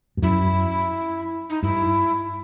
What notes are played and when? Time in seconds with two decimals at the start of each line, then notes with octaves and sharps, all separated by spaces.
0.17 G2
0.22 F#2 E4
1.50 D#4
1.63 G2 E4